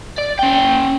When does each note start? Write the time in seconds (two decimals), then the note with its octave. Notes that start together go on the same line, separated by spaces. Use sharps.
0.18 D5
0.39 C#4 G5